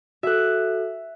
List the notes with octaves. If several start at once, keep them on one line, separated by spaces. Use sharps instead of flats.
F#4 A4 E5 F#6